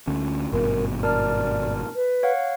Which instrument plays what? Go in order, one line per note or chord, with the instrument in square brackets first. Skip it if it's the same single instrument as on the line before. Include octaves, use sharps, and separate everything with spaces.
[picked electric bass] D2 D3 C#4
[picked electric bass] G#1 G2 B2 [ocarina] A#4
[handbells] A#4 A5 F6 [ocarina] D5
[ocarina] B4
[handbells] C#5 F5 F#5